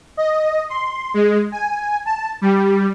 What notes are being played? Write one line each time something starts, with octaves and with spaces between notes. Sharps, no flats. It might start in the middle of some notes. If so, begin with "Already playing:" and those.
D#5
C6
G#3
G#5
A5
G3